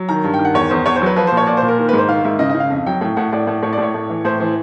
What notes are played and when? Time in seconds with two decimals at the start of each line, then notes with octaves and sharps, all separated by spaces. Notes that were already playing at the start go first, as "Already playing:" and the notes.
Already playing: F#3
0.09 D#3 A#5
0.24 G2
0.34 G5
0.39 D#3
0.45 F#5
0.54 E2 C#5
0.70 E2 C5
0.86 E2 C#5
0.96 C5
1.02 F#3 B4
1.16 F3 B4
1.27 C5
1.32 A#2
1.37 C#5
1.47 A#2 D5
1.57 C5
1.62 A#2
1.68 A#4
1.79 D#3 A#4
1.89 B4
1.93 G#2
1.98 C5
2.09 D#3 F5
2.24 G#2 E5
2.39 C#3 D#5
2.50 D#5
2.54 C#3
2.60 F5
2.70 F2
2.86 F#3 G5
3.01 A2 G5
3.17 A2 F#5
3.32 A2 D5
3.47 A2
3.63 A2 C#5
3.73 D5
3.78 A2
3.83 C#5
3.94 A2
4.10 E3
4.25 A2 C5
4.40 E3 C5